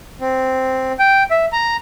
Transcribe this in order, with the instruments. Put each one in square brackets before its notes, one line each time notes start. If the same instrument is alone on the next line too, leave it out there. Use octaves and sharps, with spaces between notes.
[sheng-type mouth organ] C4
G5
E5
A#5